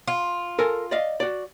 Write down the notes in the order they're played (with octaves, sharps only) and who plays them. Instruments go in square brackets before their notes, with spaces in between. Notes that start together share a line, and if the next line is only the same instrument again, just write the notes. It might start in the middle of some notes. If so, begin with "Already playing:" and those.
[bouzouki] F4
[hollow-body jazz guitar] A4 A#4 G#5
D5 D#5 F5
F#4 D5